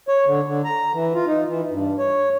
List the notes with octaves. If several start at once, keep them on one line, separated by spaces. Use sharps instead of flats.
C#5
D3
D3
A#5
E3
F4
D#4
E3
G2
C#5